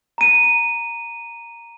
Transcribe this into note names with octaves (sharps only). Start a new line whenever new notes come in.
A#5 D#7